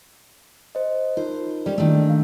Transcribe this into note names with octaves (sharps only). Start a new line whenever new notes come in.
C5 D#5
D#4 F4 A#4 C5
G3 C#4 A4 D5
D#3 A3 A#3 D4 E4
F5